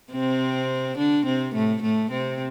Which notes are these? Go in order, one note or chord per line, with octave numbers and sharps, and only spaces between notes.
C3 C4
D3 D4
C3 C4
A2 A3
A2 A3
C3 C4